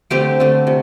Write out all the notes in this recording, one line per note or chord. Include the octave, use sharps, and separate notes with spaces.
D3 A3 C4 G4
D3 A3 C4
C3